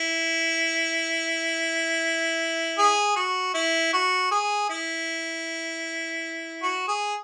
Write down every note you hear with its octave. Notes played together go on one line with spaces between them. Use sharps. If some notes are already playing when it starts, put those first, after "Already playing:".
Already playing: E4
G#4
F#4
E4
F#4
G#4
E4
F#4
G#4